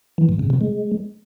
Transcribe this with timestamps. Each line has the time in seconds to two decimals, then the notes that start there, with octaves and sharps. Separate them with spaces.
0.18 E3
0.29 G#2
0.39 C#3
0.50 C3
0.61 G#3